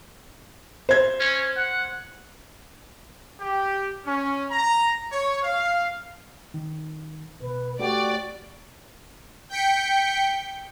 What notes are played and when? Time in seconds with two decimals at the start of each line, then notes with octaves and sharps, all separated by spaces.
0.89 C5 G#6
1.20 C#4
1.56 F#5
3.39 G4
4.05 C#4
4.50 A#5
5.12 C#5
5.43 F5
6.54 D#3
7.42 B2 B4
7.79 A3 F#4 G4 D5 G5
9.49 G5 G6 B6 C#7